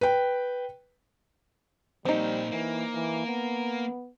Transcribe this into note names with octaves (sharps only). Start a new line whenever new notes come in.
B4 G5
A#2 F3 G3 C4 D#4
E3 A#3
E3
B3